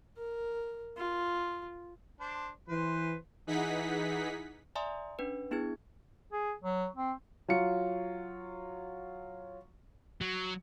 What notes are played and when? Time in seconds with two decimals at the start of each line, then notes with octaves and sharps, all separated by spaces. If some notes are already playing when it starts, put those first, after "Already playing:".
0.17 A#4
0.97 F4
2.20 D4 C5
2.68 E3 B4 C5
3.47 E3 D#4 G#4 F#5 B6
4.75 D5 E5 G#5 A#5 C6 D#6
5.19 C#4 D4 B4
5.51 B3 D4 E4 G#4 G#6
6.32 G#4
6.64 F#3
6.96 C4
7.48 F#3 F4 C#7
10.21 F#3